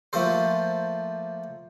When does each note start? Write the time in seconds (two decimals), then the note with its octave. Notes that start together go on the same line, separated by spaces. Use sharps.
0.13 F3 A3 A#3 A4 C5